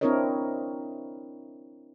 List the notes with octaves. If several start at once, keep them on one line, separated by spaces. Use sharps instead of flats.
C4 D4 E4 A#4 C#5 D#5